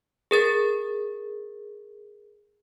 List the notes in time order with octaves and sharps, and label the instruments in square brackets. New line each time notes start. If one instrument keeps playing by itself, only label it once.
[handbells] G#4 A#4 A6